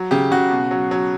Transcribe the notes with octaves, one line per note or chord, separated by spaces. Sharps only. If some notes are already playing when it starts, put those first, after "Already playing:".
Already playing: F#3
C#3 G4
C#3 F#4
B2
F#3
F#3